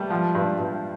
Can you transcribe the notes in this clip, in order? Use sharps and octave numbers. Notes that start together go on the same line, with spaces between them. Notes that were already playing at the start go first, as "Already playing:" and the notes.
Already playing: G3 A3
F3
G2
G2